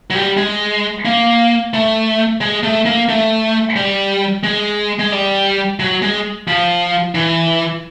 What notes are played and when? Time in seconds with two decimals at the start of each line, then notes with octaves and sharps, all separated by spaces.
0.10 F#3
0.15 G3
0.37 G#3
1.05 A#3
1.74 A3
2.41 G#3
2.63 A3
2.86 A#3
3.09 A3
3.76 G3
4.44 G#3
4.99 G#3
5.12 G3
5.80 F#3
6.02 G#3
6.48 F3
7.15 E3